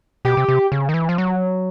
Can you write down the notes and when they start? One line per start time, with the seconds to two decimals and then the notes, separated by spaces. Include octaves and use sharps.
0.25 B2 G4
0.37 C3
0.48 C3
0.72 C#3
0.89 D#3
0.94 E3
1.09 F3
1.18 F#3